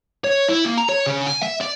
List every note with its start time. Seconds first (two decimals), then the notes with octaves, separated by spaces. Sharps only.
0.24 C#5
0.48 E4
0.65 A#3
0.77 A#5
0.89 C#5
1.06 C#3
1.27 G#5
1.43 E5
1.61 D5